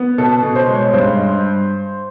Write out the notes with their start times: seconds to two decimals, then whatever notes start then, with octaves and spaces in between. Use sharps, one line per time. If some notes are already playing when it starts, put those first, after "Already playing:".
Already playing: B3
0.18 B2 A4
0.43 B2
0.56 C5
0.68 G#3
0.75 C#5
0.93 G2 C5